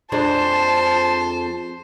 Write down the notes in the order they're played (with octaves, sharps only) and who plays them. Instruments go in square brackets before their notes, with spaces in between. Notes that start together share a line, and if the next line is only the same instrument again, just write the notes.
[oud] F2 G#3 D4 [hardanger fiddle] C5 [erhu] A5